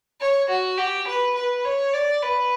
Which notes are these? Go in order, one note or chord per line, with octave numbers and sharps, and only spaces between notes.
C#5
F#4
G4
B4
B4
C#5
D5
B4